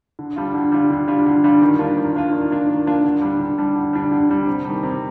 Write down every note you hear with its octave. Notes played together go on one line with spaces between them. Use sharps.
D3
G3 D4 F4
D3
G3 D4 F4
D3
G3 D4 F4
D3
G3 D4 F4
D#3
A#3 D4 F4
D#3
A#3 D4 F4
D#3
A#3 D4 F4
D#3
A#3 D4 F4
D3
G3 D4
D3
G3 D4
D3
G3 D4
D3
G3 D4
C3
D#3 G3
C3